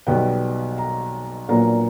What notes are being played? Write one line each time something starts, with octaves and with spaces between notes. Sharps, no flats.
B1 B2 G3 B3 G5
A#5
A#1 A#2 F#3 B3 A#5